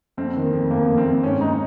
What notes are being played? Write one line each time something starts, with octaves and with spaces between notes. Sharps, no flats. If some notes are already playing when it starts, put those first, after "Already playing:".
F2 C4
D#3
F2
F2 A#3
F2
C4
F2
G#2 C#4
G#2 D#4